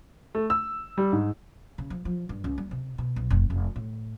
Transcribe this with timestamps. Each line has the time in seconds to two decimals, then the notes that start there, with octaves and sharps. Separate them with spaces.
0.35 A3
0.50 E6
0.98 G3
1.13 G#2
1.78 C#3
1.90 F3
2.05 F3
2.29 G2
2.44 C#2
2.58 G3
2.71 C3
2.98 B2
3.16 B1
3.30 F1
3.50 F1
3.76 A2